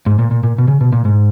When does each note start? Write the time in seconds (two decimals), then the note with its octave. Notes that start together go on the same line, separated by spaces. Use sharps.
0.06 G#2
0.19 A#2
0.31 A#2
0.44 A#2
0.58 B2
0.68 C#3
0.81 B2
0.93 A#2
1.05 G#2